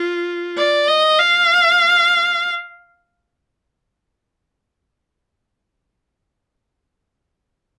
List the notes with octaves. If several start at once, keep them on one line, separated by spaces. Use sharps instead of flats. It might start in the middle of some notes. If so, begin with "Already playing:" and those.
Already playing: F4
D5
D#5
F5